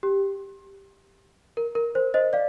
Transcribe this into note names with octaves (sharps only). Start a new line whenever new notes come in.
G4
A#4
A#4
C5
C5 D#5
D5 F5